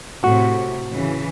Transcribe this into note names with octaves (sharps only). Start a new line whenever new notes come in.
A2 C3 F#4
C#3 E3